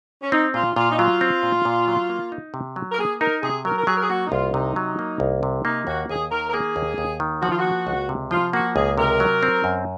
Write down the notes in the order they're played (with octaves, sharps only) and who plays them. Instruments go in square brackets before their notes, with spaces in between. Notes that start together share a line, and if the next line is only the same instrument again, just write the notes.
[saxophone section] C#4
[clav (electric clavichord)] C4 [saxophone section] D#4
[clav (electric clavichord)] A#2 [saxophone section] F4
[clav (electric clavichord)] A#2 [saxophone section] F4
[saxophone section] D#4
[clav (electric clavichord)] F#3 [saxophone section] F4
[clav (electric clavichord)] C4
A#2
A#2
F#3
A#3
D#4
C3
F#3
[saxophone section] A#4
[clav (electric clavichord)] A#3 [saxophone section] G#4
[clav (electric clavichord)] D#4 [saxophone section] A#4
[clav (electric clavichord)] C3 [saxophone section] G#4
[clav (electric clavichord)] F#3 [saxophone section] A#4
[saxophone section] A#4
[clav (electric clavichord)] F#3 [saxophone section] G#4
[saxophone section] A#4
G#4
[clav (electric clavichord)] A#3 [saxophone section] F#4
[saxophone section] D#4
[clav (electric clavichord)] C2 [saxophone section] F4
[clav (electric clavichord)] C3 [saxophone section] D#4
[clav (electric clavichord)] F#3
A#3
C2
C3
[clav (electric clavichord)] A#3 [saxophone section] D#4
[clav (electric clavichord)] D#2 [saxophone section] F#4
[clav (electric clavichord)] D#2 [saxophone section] G#4
[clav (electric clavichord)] D#3 [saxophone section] A#4
[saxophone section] A#4
[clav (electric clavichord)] A#3 [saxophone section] G#4
[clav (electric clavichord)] D#2
D#2
D#3
[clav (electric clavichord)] F3 [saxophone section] F#4
[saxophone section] F4
F#4
[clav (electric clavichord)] A#3
C#2
C3
[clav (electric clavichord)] F3 [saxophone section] F4
[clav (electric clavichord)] A#3 [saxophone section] F#4
[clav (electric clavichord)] C#2 [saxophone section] G#4
[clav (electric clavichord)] C3 [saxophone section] A#4
[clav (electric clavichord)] F#3
C4
F#2